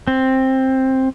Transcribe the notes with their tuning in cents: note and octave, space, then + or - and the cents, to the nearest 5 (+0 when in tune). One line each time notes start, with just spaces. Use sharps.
C4 +10